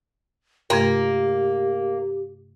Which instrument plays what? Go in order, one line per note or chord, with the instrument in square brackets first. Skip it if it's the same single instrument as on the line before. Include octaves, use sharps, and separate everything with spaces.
[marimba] G2 C3 A3 [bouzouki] A#3 [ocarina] G4